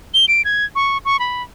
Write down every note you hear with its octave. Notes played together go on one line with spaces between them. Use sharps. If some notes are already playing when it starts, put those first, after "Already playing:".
G7
D7
G#6
C#6
C#6
B5